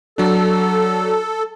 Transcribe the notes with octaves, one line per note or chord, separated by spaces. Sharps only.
F#3 D4 A4